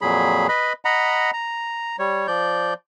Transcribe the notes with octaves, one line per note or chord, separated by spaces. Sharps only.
F2 A#2 F#3 G#4 B5
B4 D#5 B5
D#5 F#5 A#5 B5
A#5
G3 C#5
F3 D5 G6